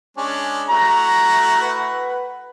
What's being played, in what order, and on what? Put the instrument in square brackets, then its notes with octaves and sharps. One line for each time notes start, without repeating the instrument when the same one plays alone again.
[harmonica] G#3 C#4 D4
[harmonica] A3 E4 F#4 [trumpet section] A#5
[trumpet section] B4 F#5